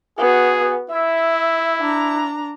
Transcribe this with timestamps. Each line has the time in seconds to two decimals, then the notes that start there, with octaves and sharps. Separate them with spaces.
0.18 B3 F#4 G#4
0.90 E4 E5
1.80 D4 A#5